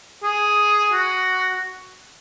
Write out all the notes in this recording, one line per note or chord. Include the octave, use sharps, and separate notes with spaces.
G#4
F#4